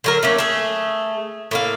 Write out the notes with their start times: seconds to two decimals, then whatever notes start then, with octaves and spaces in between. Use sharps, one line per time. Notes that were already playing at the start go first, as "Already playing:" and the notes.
0.04 D3 F#3 A#4
0.23 A3 A#3 C#4
0.39 A3 G#4
1.51 A2 A#3 F5